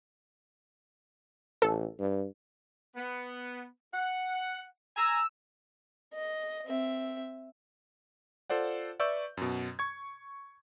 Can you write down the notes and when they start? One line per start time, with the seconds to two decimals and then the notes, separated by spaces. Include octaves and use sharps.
1.62 A1 A4
1.99 G2
2.96 B3
3.94 F#5
4.97 G#5 A#5 E6
6.13 D#5
6.66 C4 E5
8.50 F4 A4 C5 D5 F#5
8.99 B4 D5 E5 C#6 E6 G6
9.37 F#2 B2
9.79 C#6 G#6